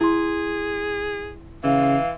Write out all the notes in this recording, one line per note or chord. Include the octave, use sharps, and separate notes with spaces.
E4 G#4 C6
C#3 E3 F5